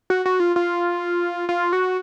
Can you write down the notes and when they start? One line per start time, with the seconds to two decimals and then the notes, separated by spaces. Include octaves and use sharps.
0.10 F#4
0.25 F#4
0.40 F4
0.56 F4
1.49 F4
1.73 F#4